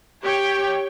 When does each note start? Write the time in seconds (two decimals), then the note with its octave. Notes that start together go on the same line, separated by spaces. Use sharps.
0.23 G4 C#5 G5